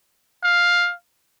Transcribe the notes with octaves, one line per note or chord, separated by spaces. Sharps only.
F5